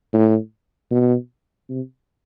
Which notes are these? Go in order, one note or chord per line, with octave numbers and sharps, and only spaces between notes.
A2
B2
C3